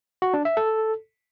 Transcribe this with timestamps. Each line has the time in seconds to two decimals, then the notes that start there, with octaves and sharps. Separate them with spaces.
0.22 F#4
0.34 D4
0.45 E5
0.57 A4